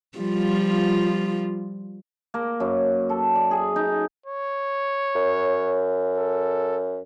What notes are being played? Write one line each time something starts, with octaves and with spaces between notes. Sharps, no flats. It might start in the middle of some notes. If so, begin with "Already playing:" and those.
F3 G3 F4
A#3
F#2
A4
D5
G#4
D#4
C#5
F#2
A4